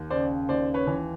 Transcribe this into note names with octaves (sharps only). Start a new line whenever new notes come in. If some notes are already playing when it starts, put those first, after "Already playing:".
Already playing: D#2
C#3 C5 D5
D#2 C5 D5
B4 C#5
E3